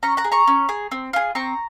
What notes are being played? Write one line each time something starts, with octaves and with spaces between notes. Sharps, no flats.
C#4 A#5 C#6
F#5 A#5
G#4
A#5 C#6
C#4
G#4
C4
F4 G#4
C4 A#5 C#6